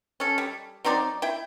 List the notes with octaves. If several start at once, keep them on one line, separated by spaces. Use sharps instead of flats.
C#4 A4
G3
F#3 C4 D#4 D5
E4 G5